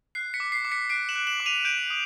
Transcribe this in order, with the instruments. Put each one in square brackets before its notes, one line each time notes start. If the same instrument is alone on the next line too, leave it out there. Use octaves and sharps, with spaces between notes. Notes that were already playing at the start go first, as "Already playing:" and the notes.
[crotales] F#6 C7
B6 C#7
D6
C7
D6
B6 C#7
F#6 C7 D7
E7 F#7
F#6
E7 F#7
D6
D#7 F7
G6 D7 E7
D#6